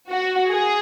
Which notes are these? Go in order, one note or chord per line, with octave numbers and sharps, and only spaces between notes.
F#4
G#4